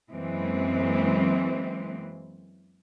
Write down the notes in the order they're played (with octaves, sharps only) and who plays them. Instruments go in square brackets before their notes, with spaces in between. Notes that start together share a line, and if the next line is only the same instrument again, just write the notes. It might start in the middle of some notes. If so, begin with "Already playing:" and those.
[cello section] F#2 E3 F#3 G#3 A#3 C4